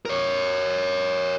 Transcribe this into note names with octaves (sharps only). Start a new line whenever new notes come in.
A#4 C#5